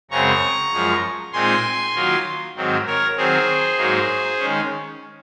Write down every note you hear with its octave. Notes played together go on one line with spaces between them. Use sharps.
F#2 C#3 G#3 C4 A#5 C#6
F#2 F3 G#3
A#2 G#3 C4 D#4 G#5 C6
D#3 F#3 A#3 F4
G#2 D#3 F#3 C4
A#4 C#5
D#3 F#3 C4 G#4 C5
G#2 F#3 A#3 D#4
D#3 G#3 C#4